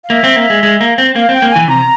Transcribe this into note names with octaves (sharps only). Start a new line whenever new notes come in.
F5
A#3 E5
C4
A#3
G#3
G#3
A#3
C4
A#3 F5
C4
G5
A#3
E3 G#5
C3 A#5